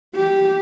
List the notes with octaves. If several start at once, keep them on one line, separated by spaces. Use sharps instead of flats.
G4